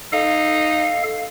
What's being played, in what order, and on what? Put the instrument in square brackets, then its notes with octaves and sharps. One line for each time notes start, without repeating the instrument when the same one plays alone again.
[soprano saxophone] D#4 [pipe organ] A4 F5